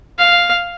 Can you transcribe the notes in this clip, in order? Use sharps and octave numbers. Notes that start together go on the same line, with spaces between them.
F5